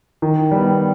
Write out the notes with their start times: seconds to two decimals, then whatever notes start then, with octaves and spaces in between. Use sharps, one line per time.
0.22 D#3
0.51 G3 B3